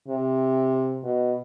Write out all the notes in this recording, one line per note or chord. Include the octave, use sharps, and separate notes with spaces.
C3
B2